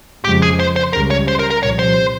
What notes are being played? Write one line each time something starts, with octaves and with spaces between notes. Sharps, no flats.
F2 C#3 F3 G#3 G4
G#4
C5
C5
C#2 C#3 G3 A#4
C#5
C5
A#4
A#4
C2 A#2 F3 C#5
C5